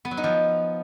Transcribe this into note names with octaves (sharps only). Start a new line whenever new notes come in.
B3
F#3
D#4
F3